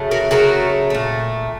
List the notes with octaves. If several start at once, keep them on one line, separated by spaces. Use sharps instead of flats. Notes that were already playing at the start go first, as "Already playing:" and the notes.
Already playing: C#3 F#3 A3
F#4 A#4
C#3 F#3 A3 F#4 A#4
A#2 A3